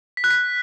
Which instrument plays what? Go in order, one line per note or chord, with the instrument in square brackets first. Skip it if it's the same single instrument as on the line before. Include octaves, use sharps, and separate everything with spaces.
[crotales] B6
F#6
B6